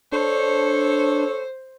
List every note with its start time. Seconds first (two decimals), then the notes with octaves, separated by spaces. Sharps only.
0.12 D4 A4 C5 C#5